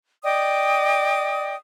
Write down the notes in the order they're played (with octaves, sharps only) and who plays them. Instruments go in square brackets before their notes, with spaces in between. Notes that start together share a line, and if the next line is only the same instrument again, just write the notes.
[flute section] D5 D#5 G5 D#6